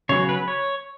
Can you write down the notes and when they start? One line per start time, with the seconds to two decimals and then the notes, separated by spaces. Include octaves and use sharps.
0.09 C#3 F#3 B3 C#5
0.29 B4
0.48 C#5